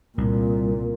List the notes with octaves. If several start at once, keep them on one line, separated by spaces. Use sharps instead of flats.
C2 A#2